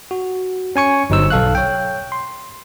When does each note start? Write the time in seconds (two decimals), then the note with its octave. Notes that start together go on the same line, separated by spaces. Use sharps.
0.11 F#4
0.76 C#4 G#5 C#6 C#7
1.10 G1 F#3 D#4 C5 E6
1.30 B1 A4 F5 F#6
1.55 C#5 G5
2.12 C6